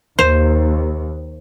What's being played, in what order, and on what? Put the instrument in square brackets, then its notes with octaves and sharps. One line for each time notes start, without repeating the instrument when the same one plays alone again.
[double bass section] D#2 [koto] C5